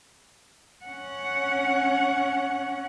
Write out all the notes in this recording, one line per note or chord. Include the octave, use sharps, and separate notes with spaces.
C#4 F#5